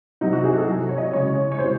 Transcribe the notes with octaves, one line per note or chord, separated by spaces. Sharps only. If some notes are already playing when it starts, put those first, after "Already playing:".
C3 F#3 D#4
F#4
G#4
A4
C3 F#3
C#5
D#5
C#3 G#3 C#5
C#5
C3 E3 G#3 C5